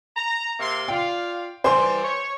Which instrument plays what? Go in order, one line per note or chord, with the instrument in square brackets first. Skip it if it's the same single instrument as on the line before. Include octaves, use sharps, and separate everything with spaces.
[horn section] A#5
C3 A#3 C6
[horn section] F4 D5 F5 [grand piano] G5
[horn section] E3 G3 [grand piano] C5 G#5 C6
[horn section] C#5